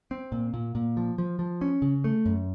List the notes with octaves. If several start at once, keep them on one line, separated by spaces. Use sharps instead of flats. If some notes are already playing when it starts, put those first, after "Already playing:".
C4
A#2
A#2
A#2
F3
F3
F3
C#4
C#3
A3
F#2